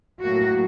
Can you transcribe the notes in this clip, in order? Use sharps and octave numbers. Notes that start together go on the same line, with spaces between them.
A2 F#3 A#3 F#4